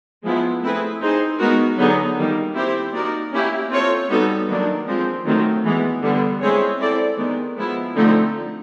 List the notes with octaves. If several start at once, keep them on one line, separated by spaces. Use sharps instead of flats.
F3 G#3 B3 E4
A3 C4 E4 G#4 B4
C4 D#4 G#4 C5
G#3 B3 D#4 F#4 A#4
D3 F#3 B3 D#4 G#4
D#3 G3 A#3
C4 E4 G4 C5
A#3 D#4 F#4 A#4 D5
A#3 C#4 E4 G4
C4 F4 A4 C#5
G3 B3 D#4 F#4 A4
D#3 F#3 A#3 D4 F#4
F3 G#3 C4
D#3 F#3 A3 C4
E3 G#3 B3
D3 G3 B3
G#3 C4 E4 G#4 C#5
C4 E4 A4 D5
D#3 G#3 B3
F3 G#3 B3 E4
D3 F3 A3 C4 D#4